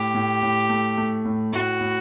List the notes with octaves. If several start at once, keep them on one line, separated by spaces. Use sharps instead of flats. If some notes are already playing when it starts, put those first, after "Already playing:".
Already playing: A2 G4
A2
A2
A3
A3
A2
A2 F#4
A2